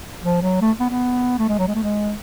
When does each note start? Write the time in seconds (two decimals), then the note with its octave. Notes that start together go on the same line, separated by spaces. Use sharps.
0.22 F3
0.42 F#3
0.61 A3
0.80 B3
0.90 B3
1.39 A3
1.48 G#3
1.58 F#3
1.67 G#3
1.75 A3
1.83 G#3